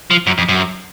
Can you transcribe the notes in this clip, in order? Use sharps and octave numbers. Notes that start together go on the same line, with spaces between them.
F3
F#2
F2
F#2